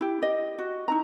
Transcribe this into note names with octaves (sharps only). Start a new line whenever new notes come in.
E4 G4
G4 D#5
F#4
D#4 E4 A#5